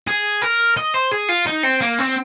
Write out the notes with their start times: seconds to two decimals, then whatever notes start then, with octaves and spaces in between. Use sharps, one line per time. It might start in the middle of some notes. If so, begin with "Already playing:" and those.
0.07 G#4
0.42 A#4
0.77 D#5
0.94 C5
1.11 G#4
1.29 F4
1.46 D#4
1.63 C4
1.81 A#3
1.99 C4